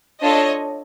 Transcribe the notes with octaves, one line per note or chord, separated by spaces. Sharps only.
D4 F4 A4 C#5 D#5